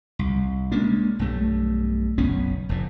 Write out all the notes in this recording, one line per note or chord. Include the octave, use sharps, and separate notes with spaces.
C2
G#3 A#3 C#4 D4
B1 G2 A3
F#1 B1 B3 C#4
F1 A2